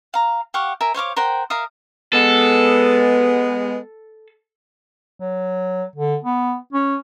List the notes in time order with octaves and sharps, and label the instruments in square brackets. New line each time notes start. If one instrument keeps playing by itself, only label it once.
[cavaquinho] F5 A#5
G4 F5 F#5 C#6
A#4 E5 G#5
C5 C#5 F5 D6
A#4 C5 F#5 G5
A#4 E5 F5 D#6
[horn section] G#3 B3 [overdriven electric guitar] A4
[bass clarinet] F#3
D3
B3
C#4